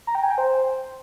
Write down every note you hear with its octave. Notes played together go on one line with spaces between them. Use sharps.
A#5
G5
G#5
G5
C5